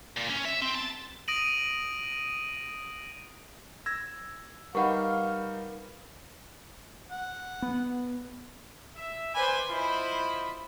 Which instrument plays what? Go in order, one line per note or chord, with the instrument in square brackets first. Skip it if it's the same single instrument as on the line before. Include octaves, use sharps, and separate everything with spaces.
[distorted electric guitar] A#2
C#4
E5
C4
A5
[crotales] D#6 A#6 D7 D#7 F#7
[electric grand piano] E6 A#6 [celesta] G#6
[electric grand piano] G3 D#4 [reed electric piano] A#4 B4 B5 [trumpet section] F5 [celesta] F#5 C#6
[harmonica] F#5
[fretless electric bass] B3
[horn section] E5
[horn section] B4 D5 B5 [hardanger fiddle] C5 G#5
[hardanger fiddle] E4 C5 [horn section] F4 D#5 B5